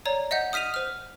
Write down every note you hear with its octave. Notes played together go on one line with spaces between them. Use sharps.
C#5 D5 A#5
D#5 E5 F#5 G6
D#6 F6 B6 D#7 F7
C5 F6